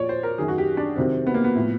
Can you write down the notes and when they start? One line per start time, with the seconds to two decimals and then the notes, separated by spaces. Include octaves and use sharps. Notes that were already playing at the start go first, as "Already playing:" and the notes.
Already playing: A#2 F3 C#5 D5
0.09 C5
0.23 A#4
0.38 F#2 D#3 F#3 G#4
0.48 F#4
0.58 G4
0.77 D4
0.96 F2 C3 D#3 F#3 C4
1.27 B3
1.34 A#3
1.44 B3
1.56 A2 F3